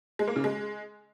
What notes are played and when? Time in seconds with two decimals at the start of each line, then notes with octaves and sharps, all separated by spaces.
0.19 G#3
0.28 A#3
0.36 C#3
0.44 G#3